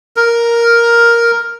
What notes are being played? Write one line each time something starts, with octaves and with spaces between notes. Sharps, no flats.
A#4